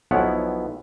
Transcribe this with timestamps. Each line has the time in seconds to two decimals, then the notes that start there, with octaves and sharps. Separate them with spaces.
0.11 B1 F3 B3 E4 C#5 F#5